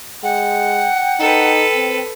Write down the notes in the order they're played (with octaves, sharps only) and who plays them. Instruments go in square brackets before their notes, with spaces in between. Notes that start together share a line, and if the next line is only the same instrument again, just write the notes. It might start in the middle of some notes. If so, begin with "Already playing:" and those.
[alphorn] G#3 [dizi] F#5 [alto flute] G5
[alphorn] D#4 [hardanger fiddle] A4 B4
[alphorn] C4